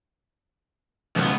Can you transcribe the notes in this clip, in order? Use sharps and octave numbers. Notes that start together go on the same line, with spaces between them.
C#2 B2 D#3 F3 B3